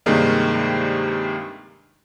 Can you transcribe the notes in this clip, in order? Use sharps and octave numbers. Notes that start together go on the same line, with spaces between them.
G2 C3 D#3 G3 G#3 A#3